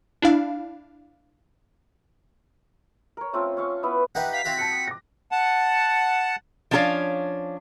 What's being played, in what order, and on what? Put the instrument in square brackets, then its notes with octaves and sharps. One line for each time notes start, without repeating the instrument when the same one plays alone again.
[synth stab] D4 E4 F5
[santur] A#4 C#5
A3 C4 C#4 F4
C#4 F5 C#6
B3 E4 B4
[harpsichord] D#4 G4 B4 [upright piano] E5 F#5 [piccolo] F#6
[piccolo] F5 [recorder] B6
[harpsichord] C4 E4 F#4 [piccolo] F5
[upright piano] A5 F#6 [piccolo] C#7
[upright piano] D#6
D6 A#6
[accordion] F#5 A5
[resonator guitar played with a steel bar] F3 C#4 D4 A4 C#5 F5